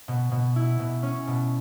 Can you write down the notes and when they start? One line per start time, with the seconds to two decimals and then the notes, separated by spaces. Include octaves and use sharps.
0.08 B2
0.32 B2
0.56 E4
0.79 B2
1.03 C#4
1.27 B2